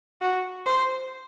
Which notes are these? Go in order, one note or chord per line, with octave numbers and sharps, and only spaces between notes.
F#4
C5